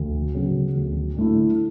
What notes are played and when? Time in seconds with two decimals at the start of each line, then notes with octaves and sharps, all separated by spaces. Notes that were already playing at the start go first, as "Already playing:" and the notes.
Already playing: D2
0.35 C#3 F#3 B3
0.76 D2
1.16 D3 A3 E4